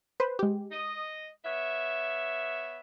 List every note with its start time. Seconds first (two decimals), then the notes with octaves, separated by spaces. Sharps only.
0.20 B4 C5
0.39 G#3 G4
0.72 D#5
1.45 B3 C#5 E5